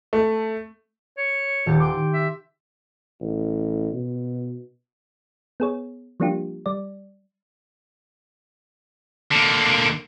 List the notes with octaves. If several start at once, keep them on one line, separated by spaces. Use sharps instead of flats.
A3
C#5
D#1 G4 A6
G5 C6 D6
E5
A1
B2
B3 G#4 C#5
F3 G3 A#3 D4 F4 G4
G3 D5
D3 A#3